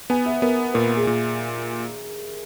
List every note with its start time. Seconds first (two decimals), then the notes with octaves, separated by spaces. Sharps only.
0.10 B3 G#5
0.26 E5
0.42 B3 A#4
0.74 A#2 A#4
0.96 G#4
1.07 A#2